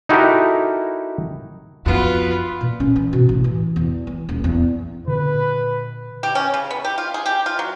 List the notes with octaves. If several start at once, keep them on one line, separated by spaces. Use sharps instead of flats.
D#4 E4 F#4 G4 A4 A#4
F2 B3 F4 F#4 B4
A#2
C#4
E3
B2
A1
E3
E2
E3
D#1
E2
A#2 D3 B4
G4
C#4
C#3
B3
G4
F4
G#4
G4
F4
F#3